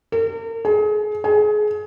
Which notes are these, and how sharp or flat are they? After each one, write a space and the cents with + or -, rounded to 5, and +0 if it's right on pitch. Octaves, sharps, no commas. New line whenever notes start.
A#4 -40
G#4 +30
G#4 +25